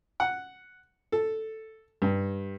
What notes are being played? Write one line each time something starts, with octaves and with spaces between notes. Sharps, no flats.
F#5
A4
G2